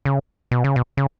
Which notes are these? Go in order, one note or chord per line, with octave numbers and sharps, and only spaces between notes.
C#3
B2
C#3
B2
C#3